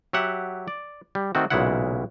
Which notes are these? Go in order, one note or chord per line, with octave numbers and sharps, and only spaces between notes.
F#3 G4 E5 F#5
D5
G3
D#3 A3 C4 F#4
B1 A#2 C#3 G#3 E4 F#5